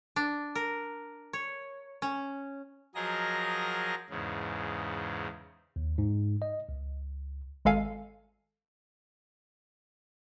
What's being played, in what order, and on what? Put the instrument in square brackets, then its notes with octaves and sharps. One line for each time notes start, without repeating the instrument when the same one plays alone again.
[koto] D4
A#4
C#5
C#4
[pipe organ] F3 F#3 G#4 A#4 D#5 A#6
E2 G#2 C#3
[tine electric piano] D#2
G#2
D#5
C#2
[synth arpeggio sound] G#1 G#3 A4 F5 G#5